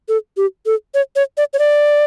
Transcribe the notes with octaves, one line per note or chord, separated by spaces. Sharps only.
A4
G4
A4
C#5
C#5
D5
C#5
D5